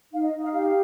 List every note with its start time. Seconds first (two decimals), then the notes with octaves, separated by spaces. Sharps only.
0.12 D#4 F5
0.23 D#5
0.32 D#4
0.43 F5
0.53 G4 F5